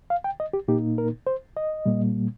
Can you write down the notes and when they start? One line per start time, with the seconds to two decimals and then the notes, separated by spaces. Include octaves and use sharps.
0.10 F5
0.24 G5
0.40 D#5
0.53 G4
0.68 A#2 A#3 D#4 G4
0.98 A#4
1.27 C5
1.57 D#5
1.86 A#2 G3 A#3